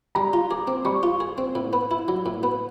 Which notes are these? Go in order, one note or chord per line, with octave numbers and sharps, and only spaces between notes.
G3 A#5
F4
G#4 D6
C4
G3 C#6
F4
G#4
C4
A2
B3
E4
F#3
A2
B3